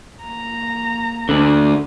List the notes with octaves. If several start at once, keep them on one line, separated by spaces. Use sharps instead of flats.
A#3 A#5
D2 D3